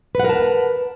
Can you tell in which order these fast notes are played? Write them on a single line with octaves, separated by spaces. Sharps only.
B4 F#5 A#4 A5